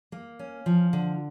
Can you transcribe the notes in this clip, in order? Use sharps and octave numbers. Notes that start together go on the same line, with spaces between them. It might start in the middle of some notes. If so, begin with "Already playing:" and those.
A#3
C#4
F3
D3